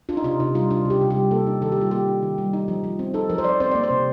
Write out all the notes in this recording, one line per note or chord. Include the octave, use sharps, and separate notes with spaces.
D4 F4
D#4
C3 F4
C3 D#4
G3 F4
D4 F4
C3 G4
C3
G4
G3
A#3 A4
D#4
D#3 A4
G4
G3 F4
A#3 G4
D#4
D#3
G3
D#4
F3
F3
C4
D#4 A4
F3 A#4
C5
F3 D5
C4 C5
A#3 D5
C5
C3